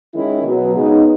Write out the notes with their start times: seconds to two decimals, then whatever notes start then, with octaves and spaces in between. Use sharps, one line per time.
0.14 D#3 G#3 C#4 E4
0.44 B2 F#3 B3
0.74 C#3 G#3 B3 D#4